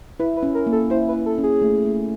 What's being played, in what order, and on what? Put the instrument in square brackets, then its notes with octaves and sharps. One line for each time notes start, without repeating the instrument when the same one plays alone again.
[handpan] E4 [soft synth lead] B4
[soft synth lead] B4
[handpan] C#4
[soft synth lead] A#4
[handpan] A#3
[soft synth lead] A4
[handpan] E4 [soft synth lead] C5
[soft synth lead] B4
[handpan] E4
[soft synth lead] A4
[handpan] C#4
[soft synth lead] G#4
[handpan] A3
A3